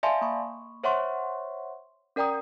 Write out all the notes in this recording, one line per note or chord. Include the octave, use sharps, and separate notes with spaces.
D5 E5 F5 G#5 A5 C6
A#3 B5 C#6
C5 C#5 E5 F#5 C6 C#6
C#4 A#4 D5 G5 A#5 D#6